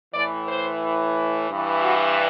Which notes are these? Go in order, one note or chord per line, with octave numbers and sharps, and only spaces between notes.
A2 E3 D5
C5
G2 E3
F#4